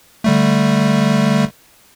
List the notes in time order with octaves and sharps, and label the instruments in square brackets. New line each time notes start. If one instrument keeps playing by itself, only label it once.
[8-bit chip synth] D3 G3 A3